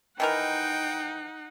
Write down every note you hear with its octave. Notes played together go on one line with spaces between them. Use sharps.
D#3 E3 D#4 A#4 F#5 G5